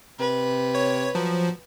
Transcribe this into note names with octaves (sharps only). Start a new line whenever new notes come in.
C3 B4
C#5
F3 F#3